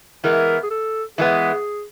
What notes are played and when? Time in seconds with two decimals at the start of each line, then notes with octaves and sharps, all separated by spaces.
0.24 E3 G#3 B3 A#4
0.63 G#4
0.71 A4
1.18 E3 G#3 B3 G#4